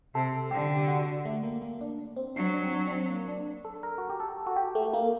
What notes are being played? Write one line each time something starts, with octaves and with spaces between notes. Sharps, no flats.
C3 A4
D3 G4
F#4
A3
A#3
A#3
D4
C4
F#3 D4
D4
C4
D4
D4
C4
A#3
D4
A4
A#4
F#4
G4
A4
F#4
G4
A3
A#3